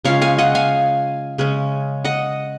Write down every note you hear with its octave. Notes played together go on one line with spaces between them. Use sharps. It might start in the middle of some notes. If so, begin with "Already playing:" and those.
C#3 G#3 C#4 F4 C#5 F5
F5 G#5
D#5 F#5
F5 G#5
C#3 G#3 C#4
D#5 F#5